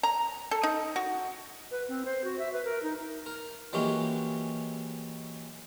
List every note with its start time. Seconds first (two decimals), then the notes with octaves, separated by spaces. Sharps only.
0.03 A#5
0.51 A4
0.63 D#4
0.96 F#4
1.71 B4
1.89 C4
2.05 C5
2.24 F#4
2.39 E5
2.53 B4
2.65 A#4
2.83 D#4
3.26 A#4
3.73 E3 F#3 G#3 A#3 C#4 G4